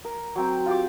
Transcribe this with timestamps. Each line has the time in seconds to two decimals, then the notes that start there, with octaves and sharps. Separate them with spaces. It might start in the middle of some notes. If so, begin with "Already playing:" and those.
0.05 A#4
0.36 F#3 C4 G5
0.66 F4 G4 D6